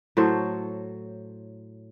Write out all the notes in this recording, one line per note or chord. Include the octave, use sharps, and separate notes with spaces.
A2 F#3 A4 C5